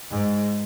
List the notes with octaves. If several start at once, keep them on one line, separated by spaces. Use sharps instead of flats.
G#2